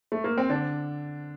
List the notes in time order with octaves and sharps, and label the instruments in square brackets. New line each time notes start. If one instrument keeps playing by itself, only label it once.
[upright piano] A3
A#3
C4
D3 D4